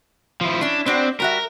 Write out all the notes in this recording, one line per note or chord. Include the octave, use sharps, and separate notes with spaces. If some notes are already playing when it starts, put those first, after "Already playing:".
F3 E4
C#4 D4 E4
B3 C4 D4 F#4
G3 F#4 A#4 E5